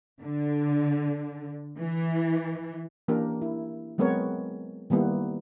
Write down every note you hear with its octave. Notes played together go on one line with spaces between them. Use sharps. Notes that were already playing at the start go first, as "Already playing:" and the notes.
D3
E3
E3 A#3 C#4 D4 G4 A#4
E4
F#3 G#3 B3 C4 A#4 C#5
D#3 G3 A#3 B3 E4